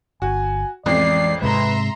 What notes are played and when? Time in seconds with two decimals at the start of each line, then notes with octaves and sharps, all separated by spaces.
0.22 G1 F#4 G#5
0.86 A1 F2 E3 G#3 D5 C7
1.42 G#2 C3 G#3 B4 E5 A#5 C6